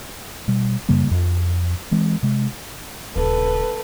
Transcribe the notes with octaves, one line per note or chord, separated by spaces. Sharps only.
B2 G3
F#2 C#3 G3 A#3
D1 F2
E3 G#3 C4
C3 G#3
D#1 C#3 A4 B4